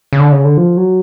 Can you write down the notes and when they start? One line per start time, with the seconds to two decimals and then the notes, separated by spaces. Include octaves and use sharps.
0.13 C#3
0.19 D3
0.32 C#3
0.45 D3
0.57 F3
0.77 F#3